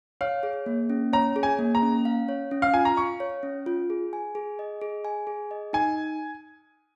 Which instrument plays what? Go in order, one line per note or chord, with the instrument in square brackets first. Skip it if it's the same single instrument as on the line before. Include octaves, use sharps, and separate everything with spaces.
[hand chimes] C#5 [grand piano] F5
[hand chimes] G#4
A#3
C#4
[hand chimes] C#5 [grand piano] A#5
[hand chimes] G#4
[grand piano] G#5
[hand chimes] A#3
[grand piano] A#5
[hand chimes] C#4
F5
C#5
C#4
[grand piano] F5
[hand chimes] F4 [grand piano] G#5
[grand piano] A#5
[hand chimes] F5 [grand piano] C#6
[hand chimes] C#5
C#4
F4
G#4
G#5
G#4
D#5
G#4
G#5
G#4
D#5
[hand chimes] D#4 [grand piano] G#5